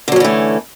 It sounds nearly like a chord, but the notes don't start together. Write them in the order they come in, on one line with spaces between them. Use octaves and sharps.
D3 F#3 C#4 E3 A3